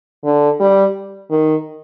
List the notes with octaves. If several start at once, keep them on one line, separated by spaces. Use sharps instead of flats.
D3
G3
D#3